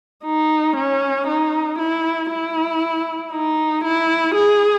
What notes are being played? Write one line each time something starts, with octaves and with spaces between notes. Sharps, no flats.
D#4
C#4
D#4
E4
E4
D#4
E4
G#4